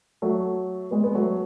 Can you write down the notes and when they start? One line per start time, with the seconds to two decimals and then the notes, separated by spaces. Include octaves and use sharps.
0.22 F#3 A3
0.91 G#3 B3
1.04 B3
1.15 F#3 A3